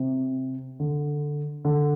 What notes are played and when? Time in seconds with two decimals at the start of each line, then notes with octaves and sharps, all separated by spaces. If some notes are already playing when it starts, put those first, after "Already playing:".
Already playing: C3
0.80 D3
1.65 D3